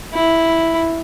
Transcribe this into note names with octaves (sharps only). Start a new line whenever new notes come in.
E4